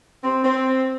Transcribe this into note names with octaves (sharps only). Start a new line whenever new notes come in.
C4
C4